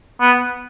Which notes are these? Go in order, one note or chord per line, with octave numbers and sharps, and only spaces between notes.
B3